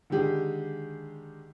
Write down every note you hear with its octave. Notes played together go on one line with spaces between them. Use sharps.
D3 D#3 G#3 G4 G#4